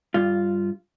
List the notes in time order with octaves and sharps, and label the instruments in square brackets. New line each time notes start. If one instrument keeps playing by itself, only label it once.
[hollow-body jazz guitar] G2 F4